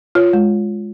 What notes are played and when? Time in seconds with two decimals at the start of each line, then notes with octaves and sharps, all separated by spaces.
0.15 F4 C#5
0.33 G#3